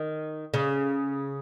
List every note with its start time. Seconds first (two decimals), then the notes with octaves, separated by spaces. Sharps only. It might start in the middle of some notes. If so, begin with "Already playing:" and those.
Already playing: D#3
0.54 C#3